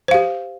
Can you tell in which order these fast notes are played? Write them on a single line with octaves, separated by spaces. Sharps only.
C5 F5 G4